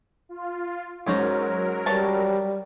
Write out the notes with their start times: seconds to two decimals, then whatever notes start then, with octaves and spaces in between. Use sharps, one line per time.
0.29 F4
1.07 G#2 F#3 C#4 A#4 A#5
1.86 G3 C#5 A5